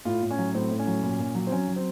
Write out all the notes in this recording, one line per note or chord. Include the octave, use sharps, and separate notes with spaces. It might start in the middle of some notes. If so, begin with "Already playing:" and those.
A2 F4
A2
C#4
F#3
A2 C4
A2
C#4
F#3
A#2
A#2
F#3
C4
F#3 C#4
F#3
C4